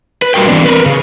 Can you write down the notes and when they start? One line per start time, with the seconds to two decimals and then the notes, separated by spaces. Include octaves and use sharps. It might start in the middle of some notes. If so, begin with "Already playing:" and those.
0.22 B4
0.34 G3 F#4 A#4 G5
0.48 E3 G3 C4 D4
0.65 A#4 B4
0.86 C#3